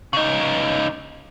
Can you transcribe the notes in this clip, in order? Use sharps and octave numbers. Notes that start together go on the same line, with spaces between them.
C#3 D#4